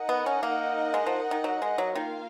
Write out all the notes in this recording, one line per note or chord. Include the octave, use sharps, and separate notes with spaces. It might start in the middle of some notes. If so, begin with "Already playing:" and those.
Already playing: D#4 A#4 D#5 F#5
B3
C#4
A#3
G#3
F3
D#3
F#3
G#3
F#3
D#3 A#3 F4 A#4 F5